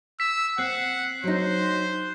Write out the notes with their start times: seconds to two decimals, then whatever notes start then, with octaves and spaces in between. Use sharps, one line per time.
0.20 E6 B6
0.58 C4 F#5 F#6 C7
1.24 F#3 D#4 C5